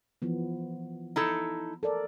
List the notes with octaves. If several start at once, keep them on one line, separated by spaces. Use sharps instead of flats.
E3 F3 B3
D#4 E4 A4
A4 A#4 D5